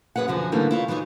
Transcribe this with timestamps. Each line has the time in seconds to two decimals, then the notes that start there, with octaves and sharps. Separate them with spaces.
0.16 F#2 G#4 B4 C#5 F#5
0.28 F#2 D3 F3 D#4 G#4
0.52 G#2 D3 E3 G3 A3 A#3
0.71 E4 F4 C#5
0.88 E3 F#3 D#4 F4 C#5